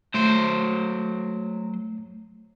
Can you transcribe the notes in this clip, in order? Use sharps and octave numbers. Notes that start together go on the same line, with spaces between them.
F#3 A3 C5